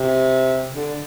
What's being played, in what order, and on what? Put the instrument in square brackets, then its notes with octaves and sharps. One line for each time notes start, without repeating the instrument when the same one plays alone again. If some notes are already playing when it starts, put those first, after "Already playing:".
Already playing: [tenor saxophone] C3
D3